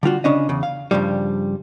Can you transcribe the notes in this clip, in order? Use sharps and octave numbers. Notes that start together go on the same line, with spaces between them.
D3 G3 F4 F#4
C#3 C#4 D4 D#5
E2 C#3
F5
G2 A#2 C#3 F3 G3